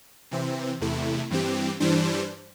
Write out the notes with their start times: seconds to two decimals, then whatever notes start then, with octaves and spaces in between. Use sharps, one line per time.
0.31 C3 E3 C4
0.81 E2 C3 A3 E4
1.30 G2 E3 C4 G4
1.80 G2 E3 G3 D4 C5